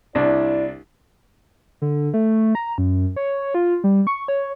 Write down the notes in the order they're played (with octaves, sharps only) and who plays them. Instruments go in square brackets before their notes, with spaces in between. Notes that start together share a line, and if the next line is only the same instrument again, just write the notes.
[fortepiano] C2 D4 [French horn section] E4 D5
[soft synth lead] D3
A3
A#5
F#2
C#5
F4
G3
C#6
C#5